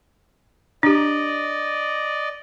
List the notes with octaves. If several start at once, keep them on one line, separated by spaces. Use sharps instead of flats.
D4 G4 D5 D#5